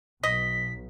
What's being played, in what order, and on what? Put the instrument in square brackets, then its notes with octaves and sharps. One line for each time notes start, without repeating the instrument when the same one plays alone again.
[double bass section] B1 [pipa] D#5 [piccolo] B6